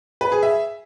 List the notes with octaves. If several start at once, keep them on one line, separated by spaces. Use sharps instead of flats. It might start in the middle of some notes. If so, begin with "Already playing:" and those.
B4
G#4
E5